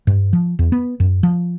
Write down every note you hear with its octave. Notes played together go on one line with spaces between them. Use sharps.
G2
F3
E2
B3
F#2
F3